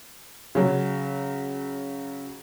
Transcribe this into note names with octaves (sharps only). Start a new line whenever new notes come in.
C#3 F#3